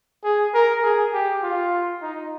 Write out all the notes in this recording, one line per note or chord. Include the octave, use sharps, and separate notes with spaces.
G#4
A#4
G#4
G4
F4
D#4